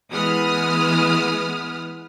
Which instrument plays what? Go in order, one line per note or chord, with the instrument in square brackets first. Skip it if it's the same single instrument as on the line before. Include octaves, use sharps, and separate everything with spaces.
[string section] E3 G#3 B3 D#6 F6